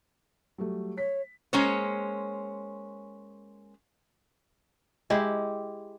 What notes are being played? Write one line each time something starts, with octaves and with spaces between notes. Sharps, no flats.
F#3 G3 A3
C#5 B6
G#3 A#3 C#4 C5 C#5
G#3 E4 G4